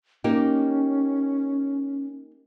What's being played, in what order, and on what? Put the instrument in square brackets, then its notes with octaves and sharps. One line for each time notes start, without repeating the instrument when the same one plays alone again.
[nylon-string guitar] A#3 D#4 G4 [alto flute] C#4